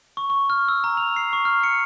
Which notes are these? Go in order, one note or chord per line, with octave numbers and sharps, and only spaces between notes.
C#6
C#6
F6
E6
A#5
F7
C7
C#6
F6
C#7